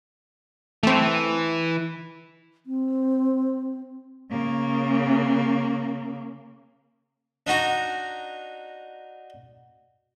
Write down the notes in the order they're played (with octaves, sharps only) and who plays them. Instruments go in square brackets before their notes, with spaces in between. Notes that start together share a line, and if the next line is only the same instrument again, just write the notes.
[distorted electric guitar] E3 [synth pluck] A3 C4
[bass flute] C4
[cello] C#3 A#3
[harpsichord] D4 D#4 F#4 A#5